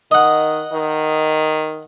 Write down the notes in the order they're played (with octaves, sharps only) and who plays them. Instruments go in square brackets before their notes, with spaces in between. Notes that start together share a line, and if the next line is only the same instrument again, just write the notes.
[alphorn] D#3 [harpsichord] D#5 F#5
[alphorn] D#3